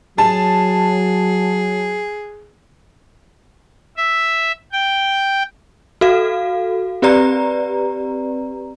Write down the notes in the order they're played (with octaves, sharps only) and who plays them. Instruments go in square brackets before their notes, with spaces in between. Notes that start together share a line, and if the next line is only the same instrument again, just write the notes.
[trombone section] F#3 [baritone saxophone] G#4 [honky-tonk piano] A5
[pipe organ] E5
G5
[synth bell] F#4 A4 F5
C4 G4 B4 D5 A#5